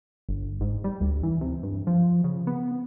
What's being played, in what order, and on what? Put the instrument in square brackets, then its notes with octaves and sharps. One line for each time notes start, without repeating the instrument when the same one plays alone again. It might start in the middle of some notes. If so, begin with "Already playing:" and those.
[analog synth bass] G1
G#2
G3
D2
E3
C3
G2
F3
C#3
B3